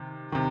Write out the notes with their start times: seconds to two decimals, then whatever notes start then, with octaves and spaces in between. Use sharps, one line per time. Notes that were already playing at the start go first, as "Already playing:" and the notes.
Already playing: C3 D#3
0.32 C3 D#3